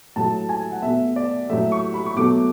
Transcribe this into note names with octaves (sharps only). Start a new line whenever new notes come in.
A2 F#3 A3 A5
G#5
F#5
B2 A3 E5
D5
A2 F#3 A3 E5
C#6
B5
C#6
B2 F#3 A3 D6